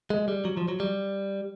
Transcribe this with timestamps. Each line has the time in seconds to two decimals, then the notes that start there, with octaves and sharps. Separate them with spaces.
0.10 G#3
0.28 G3
0.45 F#3
0.57 F3
0.68 F#3
0.80 G3